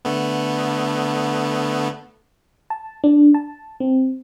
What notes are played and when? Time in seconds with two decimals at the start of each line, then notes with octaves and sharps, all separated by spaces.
0.05 D3 A3 B3
2.70 A5
3.04 D4
3.34 A5
3.80 C4